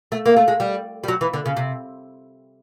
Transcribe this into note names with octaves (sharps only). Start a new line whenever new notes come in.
A3
A#3
A3
G#3
G3
G3
F#3
E3
D3
C#3
C3